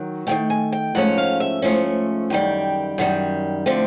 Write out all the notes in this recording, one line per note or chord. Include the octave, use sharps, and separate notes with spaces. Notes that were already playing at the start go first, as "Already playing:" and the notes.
Already playing: D#3 F#3
D#3 F#3 A3 G5
G#5
G5
G#2 F3 A3 C#4 F#5
F5
E5
G#2 F3 A3 C#4
F#2 D#3 G3 G5
F#2 D#3 G3
D3 F3 A3 C4